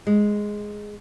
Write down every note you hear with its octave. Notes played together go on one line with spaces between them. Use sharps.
G#3